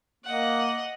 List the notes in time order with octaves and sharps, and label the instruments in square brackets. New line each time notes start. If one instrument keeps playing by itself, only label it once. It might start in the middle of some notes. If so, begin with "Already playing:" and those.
[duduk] A#3 [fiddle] D#5 F#5